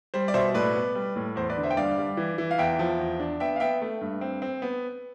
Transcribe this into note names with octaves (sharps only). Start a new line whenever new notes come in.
G3 C5
D5
B2 C5 E5
A2 B4 D5
B3
G3
A2
E2 C5
B4 D5
D3
C5 E5
G5
G2 D5 F5
G3
E3
E3
F5
E2 E5 G5
F3
E2
D4
B3 E5 G5
F5
B3 E5 G5
A3
G2
C4
C4
B3